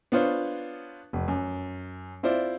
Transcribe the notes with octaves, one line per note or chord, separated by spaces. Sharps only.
B3 D4 F4 C5 C#5
F1
F#2
C4 E4 F4 C5 D5